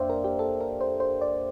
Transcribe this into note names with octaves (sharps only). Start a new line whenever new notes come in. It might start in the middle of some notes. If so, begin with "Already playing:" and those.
Already playing: F2 A#3 D4 C5 D5 E5 F5 G5
A#4
G4
A4
A#4
C5
C5
D5